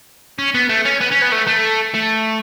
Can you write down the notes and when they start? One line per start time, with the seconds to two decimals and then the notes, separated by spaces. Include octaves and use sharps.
0.39 C#4
0.54 B3
0.69 A3
0.85 C#4
1.01 B3
1.12 C#4
1.22 B3
1.32 A3
1.47 A3
1.95 A3